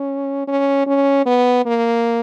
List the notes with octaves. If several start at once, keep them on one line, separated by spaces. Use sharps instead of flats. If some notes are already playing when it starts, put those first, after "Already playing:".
Already playing: C#4
C#4
C#4
B3
A#3